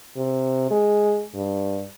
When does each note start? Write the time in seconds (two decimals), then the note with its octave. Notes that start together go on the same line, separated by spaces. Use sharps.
0.17 C3
0.71 G#3
1.35 G2